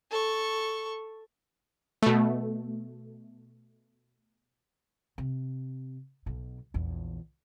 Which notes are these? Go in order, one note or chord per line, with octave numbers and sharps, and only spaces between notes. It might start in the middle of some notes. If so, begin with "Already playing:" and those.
A4 C#6
B2 A3
C3
B1 B2
A#1 E2